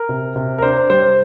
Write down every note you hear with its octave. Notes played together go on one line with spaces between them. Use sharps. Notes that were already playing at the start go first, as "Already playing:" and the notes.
Already playing: A#4
C3
C3
A#4
D4 C5
G3 C5